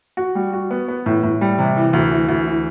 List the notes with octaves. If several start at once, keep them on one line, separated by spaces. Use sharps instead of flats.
F#4
G3
F#4
B3
B3
A2
A2
G3
C3
E3
D2
E3
D2
E3